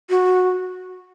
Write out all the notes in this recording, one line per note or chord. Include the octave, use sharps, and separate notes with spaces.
F#4